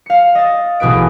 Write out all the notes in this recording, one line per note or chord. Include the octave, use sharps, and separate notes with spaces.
F5 C#7
D#5 A6
A1 B2 G#4 B4 D7